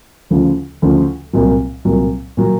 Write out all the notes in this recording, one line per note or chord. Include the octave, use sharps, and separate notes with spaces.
D2 C#3 F3
D2 C#3 F3
C2 A#2 F#3
C2 A#2 F#3
A#2 F#3